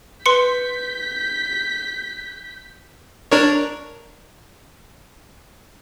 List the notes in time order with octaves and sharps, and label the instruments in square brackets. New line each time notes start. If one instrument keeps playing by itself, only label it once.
[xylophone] B4 C6 C#7 [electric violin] G6 B6
[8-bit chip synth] D4 A#4 C#5